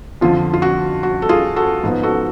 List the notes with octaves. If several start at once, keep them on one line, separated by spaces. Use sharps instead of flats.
F2 D3 F3 F4
F4
F#4
F#4
A4
F4 G#4
F#4 A4
G#2 F3 B3
F#4 A4